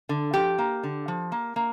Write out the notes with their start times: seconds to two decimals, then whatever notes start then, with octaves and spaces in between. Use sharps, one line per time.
0.09 D3
0.34 F3 G4
0.59 A#3
0.84 D3
1.08 F3
1.32 A#3
1.56 A#3